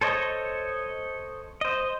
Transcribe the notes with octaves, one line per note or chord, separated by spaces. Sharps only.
A4 C5 C#5 D#5
C5 D#5